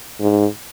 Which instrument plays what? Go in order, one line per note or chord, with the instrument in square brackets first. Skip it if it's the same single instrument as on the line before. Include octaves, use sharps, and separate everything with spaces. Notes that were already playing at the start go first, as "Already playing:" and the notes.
[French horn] G#2